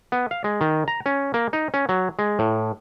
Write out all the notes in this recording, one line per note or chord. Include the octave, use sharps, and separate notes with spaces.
B3
F5
G#3
D#3
A#5
C#4
A#3
D#4
C#4
F#3
G#3
A2